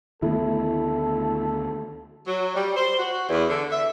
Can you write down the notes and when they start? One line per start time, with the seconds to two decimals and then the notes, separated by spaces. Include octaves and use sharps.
0.22 D2 D#3 A3 B3 E4 A4
2.26 F#3
2.54 G3
2.75 C5
2.98 F#4
3.29 E2
3.48 D3
3.71 E5